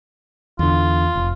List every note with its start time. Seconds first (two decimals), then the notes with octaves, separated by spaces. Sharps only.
0.59 E2 D3 F4
1.15 F1